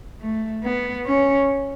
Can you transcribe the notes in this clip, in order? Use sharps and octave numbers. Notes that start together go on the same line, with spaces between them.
A3
B3
C#4